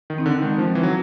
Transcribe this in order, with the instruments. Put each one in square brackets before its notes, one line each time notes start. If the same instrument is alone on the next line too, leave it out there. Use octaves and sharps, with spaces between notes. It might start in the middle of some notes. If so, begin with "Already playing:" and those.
[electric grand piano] D#3
[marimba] C4 D#4
[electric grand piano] D3
[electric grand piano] D#3 [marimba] G#3
[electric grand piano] F3
[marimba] C4 D#4
[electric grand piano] E3
F#3